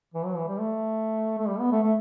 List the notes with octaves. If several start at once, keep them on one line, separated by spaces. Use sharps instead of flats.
E3
F#3
E3
G3
A3
A3
G3
B3
A3
A3